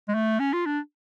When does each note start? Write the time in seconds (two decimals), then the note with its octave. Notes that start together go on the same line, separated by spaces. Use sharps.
0.08 G#3
0.14 A3
0.40 C#4
0.53 F4
0.66 D4